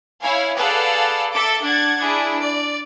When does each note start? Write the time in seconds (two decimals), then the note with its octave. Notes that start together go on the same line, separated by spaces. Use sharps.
0.21 E4 C#5 F5 G#5
0.57 G#4 A4 B4 D5 F5 F#5
1.32 A4 E5 D6
1.63 D4 F#5 G#6 A6
1.98 D4 E4 G#4
2.40 D5